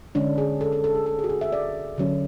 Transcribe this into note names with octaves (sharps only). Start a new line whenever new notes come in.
D3 G#3 C#4 D4
G#4
A4
A4
A4
G#4
A4
G#4
F#4
G#4
E5
D5
D3 F#3 C#4